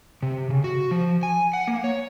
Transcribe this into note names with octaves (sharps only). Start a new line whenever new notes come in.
C3
C#3
F#4
F3
G#5
F#5
A#3
C#5